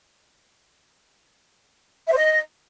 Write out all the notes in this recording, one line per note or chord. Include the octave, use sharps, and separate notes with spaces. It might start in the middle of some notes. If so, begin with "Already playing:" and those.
E5
C5
D#5